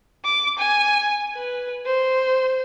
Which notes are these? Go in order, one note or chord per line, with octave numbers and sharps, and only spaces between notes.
D6
G#5
B4
C5